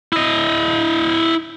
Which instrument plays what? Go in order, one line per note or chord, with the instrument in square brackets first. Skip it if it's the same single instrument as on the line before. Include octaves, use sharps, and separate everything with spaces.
[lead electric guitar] E4 D#5